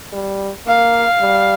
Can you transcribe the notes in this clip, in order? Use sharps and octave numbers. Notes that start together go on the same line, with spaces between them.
G3
A#3 F5
G3